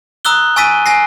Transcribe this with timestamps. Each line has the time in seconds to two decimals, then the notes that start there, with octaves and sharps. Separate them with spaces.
0.25 A#5 D#6 E6 F#6 G7
0.56 G#5 C#6 E6 A6 B6 D#7
0.86 G#5 A#6 C7